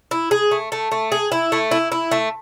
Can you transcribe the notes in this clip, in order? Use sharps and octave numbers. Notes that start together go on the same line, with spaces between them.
E4
G#4
A3
A3
A3
G#4
E4
A3
E4
E4
A3